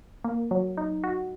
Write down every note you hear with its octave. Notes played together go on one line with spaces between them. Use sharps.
A#3
F#3
D#4
F#4